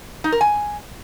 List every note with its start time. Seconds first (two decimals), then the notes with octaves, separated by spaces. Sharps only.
0.24 D#4
0.32 A#4
0.41 G#5